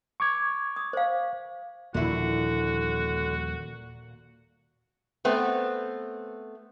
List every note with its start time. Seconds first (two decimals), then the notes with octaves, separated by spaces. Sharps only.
0.20 C#6 D6 G#6
0.76 D#6
0.93 C5 F5
1.94 D#1 A#2 D3 F3 E4 F#4
5.25 A3 B3 C4